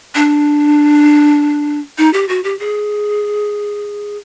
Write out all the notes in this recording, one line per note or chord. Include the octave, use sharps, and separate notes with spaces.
D4
D#4
G4
F#4
G4
G#4